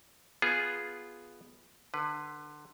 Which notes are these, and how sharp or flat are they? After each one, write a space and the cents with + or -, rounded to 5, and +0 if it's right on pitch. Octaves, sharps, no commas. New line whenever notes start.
B3 +0 F4 +0 G#4 +0
D3 +25 B4 +0